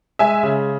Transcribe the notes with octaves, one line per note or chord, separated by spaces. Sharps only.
G#3 E5 G#5
C#3